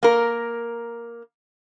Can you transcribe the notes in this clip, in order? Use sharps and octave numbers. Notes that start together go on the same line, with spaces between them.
A#3 A#4